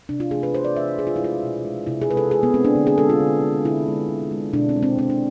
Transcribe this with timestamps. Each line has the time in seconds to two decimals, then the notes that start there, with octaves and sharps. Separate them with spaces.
0.09 C3 D4
0.20 F4
0.31 E3 A3 G#4
0.43 B4
0.53 C3 C5
0.64 D5
0.76 E3 A3 E5
0.98 B2 G#4
1.07 F4
1.16 E4
1.20 G#3 F4
1.43 B2
1.65 G#3
1.87 C3 E4
2.02 G#4
2.10 G#3 B4
2.17 A4
2.31 C3 G#4
2.43 B3
2.54 G#3 C4
2.65 D4
2.75 D3
2.87 G#4
2.98 G#3 A4
3.10 F4
3.20 D3
3.42 G#3
3.65 D3 E4
3.88 G#3
4.09 D3
4.31 G#3
4.53 B2 D4
4.69 C4
4.76 G#3
4.83 C4
4.97 B2 C4
5.10 D4